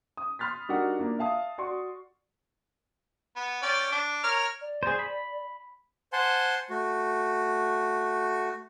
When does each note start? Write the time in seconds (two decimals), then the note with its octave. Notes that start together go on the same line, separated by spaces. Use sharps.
0.17 D#6
0.39 B5 C6 F6 A6 B6
0.69 G3 D4 D#4 F#4 A#4 F#5
0.98 A#3 D4 F4
1.19 E5 F5 A5 D#6
1.58 F#4 D5 C6 C#6
3.36 B3
3.63 C#4 D5 G5
3.92 D4
4.24 A#4 C#5 F6
4.61 D5
4.83 G#4 C5
4.99 B5
6.13 C5 F#5 G#5 A5 C6
6.70 A3 F#4